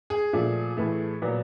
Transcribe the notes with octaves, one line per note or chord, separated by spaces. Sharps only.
G#4
A#2 F3 A3
A2 E3 A3
A#2 F#3 B3